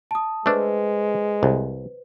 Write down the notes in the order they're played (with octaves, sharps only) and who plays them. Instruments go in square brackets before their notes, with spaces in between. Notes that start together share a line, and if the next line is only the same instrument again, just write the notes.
[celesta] A5 D#6
[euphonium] G#3 [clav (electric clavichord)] A3 D4 [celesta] B4 C5
[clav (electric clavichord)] C2